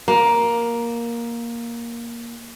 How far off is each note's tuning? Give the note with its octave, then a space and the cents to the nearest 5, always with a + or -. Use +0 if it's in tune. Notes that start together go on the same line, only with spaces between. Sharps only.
A#3 +10